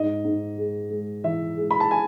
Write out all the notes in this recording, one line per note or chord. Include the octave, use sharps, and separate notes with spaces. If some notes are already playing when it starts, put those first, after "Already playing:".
Already playing: G#2 D#5
G#2
G#3
G#3
E3 E5
G#3
B5
A5
G#5